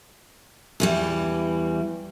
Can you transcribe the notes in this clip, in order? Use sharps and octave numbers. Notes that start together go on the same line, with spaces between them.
E2 E3 G3